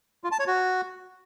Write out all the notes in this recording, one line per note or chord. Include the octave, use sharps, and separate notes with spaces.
F4
A5
C#5
F#4